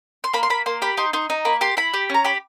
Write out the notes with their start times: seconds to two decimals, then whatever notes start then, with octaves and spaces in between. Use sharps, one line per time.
0.24 C6
0.33 A#3 B5
0.43 C6
0.50 A#3 B5
0.66 A#3 C6
0.82 G4 B5
0.97 D#4 C6
1.13 D#4 C6
1.30 D#4
1.45 A#3 B5
1.61 G4 C6
1.77 E4 B5
1.94 G4
2.10 C#4 A#5
2.25 G4 B5